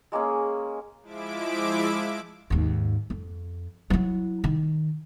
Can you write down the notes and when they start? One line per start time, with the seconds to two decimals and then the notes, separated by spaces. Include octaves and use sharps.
0.12 G#3 A#3 C#4 G#4
1.02 F3 G#3 E4 E5 D6 D7
2.50 D#2 G#2
3.10 F2
3.90 F#3 E4
4.44 D#3